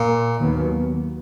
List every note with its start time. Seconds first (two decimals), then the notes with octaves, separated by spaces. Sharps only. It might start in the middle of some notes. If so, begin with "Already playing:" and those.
Already playing: A#2
0.40 D#2 D#3 F#3 B3